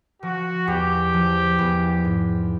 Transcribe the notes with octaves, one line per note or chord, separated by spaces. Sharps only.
F3 F#4
E2 G4
F3
E2
G#2